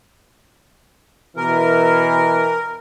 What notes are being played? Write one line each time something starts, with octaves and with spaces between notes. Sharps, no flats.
B2 E3 A#4